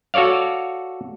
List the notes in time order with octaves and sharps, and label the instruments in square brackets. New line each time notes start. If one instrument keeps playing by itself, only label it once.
[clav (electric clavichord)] F#4 A4 C#5 D5 F5